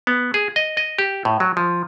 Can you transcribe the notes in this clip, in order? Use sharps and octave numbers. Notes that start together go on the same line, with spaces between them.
B3
G#4
D#5
D#5
G4
A2
F#3
F3